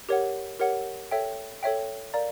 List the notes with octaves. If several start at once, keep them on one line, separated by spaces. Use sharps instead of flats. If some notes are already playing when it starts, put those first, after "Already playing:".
G4 A#4 C#5 F#5
G4 A#4 C#5 F#5
A4 C#5 E5 G5
A4 C#5 E5 G5
A#4 D5 F5 A#5